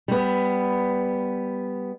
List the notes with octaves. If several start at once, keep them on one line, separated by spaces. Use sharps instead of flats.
G3 B3